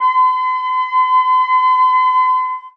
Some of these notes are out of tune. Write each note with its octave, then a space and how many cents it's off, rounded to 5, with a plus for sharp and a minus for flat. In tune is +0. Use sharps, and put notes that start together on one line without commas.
C6 -45